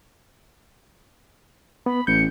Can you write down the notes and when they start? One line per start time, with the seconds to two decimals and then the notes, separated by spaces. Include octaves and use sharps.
1.86 B3 B5
2.07 A1 G6 C#7